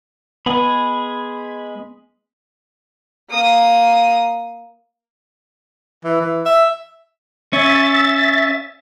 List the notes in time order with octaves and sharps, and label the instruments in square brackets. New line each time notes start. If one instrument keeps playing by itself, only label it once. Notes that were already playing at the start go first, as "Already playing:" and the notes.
[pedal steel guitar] G#3 G#4 B5 [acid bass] B3
[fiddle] A#3 D#6
[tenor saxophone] E3
E3
E5
[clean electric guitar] C#4 [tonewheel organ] E5 A6